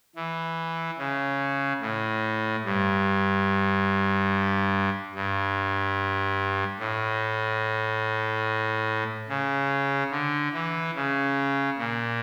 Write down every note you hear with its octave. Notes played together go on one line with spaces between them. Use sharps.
E3
C#3
A2
G2
G2
A2
C#3
D3
E3
C#3
A#2